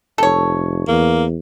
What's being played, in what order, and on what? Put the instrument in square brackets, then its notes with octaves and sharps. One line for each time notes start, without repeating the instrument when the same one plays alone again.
[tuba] F1 [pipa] A4 C#5
[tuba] E2 [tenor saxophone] A#3